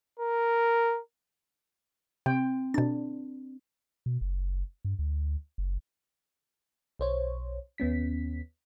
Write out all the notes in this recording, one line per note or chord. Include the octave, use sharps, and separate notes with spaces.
A#4
C3 C4 G5
B2 D4 A6
B2
F#1
G2
D2
F#1
B1 C5 C#5
D#2 B3 C#4 B6